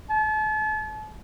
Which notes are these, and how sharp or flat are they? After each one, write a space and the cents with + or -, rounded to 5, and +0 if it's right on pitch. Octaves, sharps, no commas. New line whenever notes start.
A5 -40